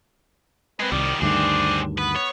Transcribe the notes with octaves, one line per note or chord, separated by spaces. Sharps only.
G#3 C4 B4
C2 D#3 G3 D5
D2 G2 D#3 C4 D4 G#4
B3 B4
C#5